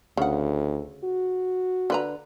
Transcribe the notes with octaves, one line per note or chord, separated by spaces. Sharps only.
D2 C#3 F#5
F#4
D3 B4 A#5